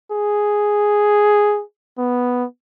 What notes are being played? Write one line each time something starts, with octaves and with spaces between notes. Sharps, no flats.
G#4
B3